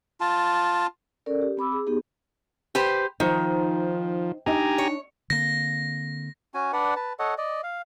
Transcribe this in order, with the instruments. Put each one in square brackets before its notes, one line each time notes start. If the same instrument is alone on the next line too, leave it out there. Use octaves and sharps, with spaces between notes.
[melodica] F4 A5
[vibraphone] C#4 A4 A#4 D5
G4
C4 B5 D6 E6
G#4
B3 D#4 G4 G#4
[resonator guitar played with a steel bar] G4 B4 C5
[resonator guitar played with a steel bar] D#3 [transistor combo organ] F3 [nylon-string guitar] D#4 C5
[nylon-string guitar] D4 D#4 D#5 [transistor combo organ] G4 G#5 A#5
[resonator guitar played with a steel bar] C#5
[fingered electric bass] D3 A#3 C4 [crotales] A#6
[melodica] C#4 F#4 G#5
D4 B4 D5 F#5
B4 A5
A4 C#5 D#5 F#5
D5 D#5
F5